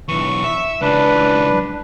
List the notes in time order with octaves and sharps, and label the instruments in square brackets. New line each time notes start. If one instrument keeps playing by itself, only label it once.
[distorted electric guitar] B1 E3 [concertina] C#6
[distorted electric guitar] E5
[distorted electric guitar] C#2 E3 [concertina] D4 B4